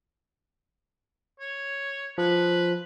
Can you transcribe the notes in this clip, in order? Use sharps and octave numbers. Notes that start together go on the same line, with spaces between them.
C#5
F3 B4